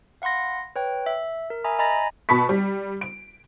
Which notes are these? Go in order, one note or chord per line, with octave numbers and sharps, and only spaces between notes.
F5 F#5 B5 C6 A#6
B4 C#5 G5
E5
A#4
E5 G#5 A#5 B5 D#6
D#5 G#5 A#5 B5 A6 A#6
B2 A5 B5 C#6 B6
G3
D7